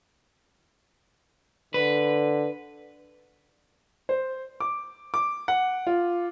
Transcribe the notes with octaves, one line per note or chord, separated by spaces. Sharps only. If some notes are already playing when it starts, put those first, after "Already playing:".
D3 B4
C5
D6
D6
F#5
F4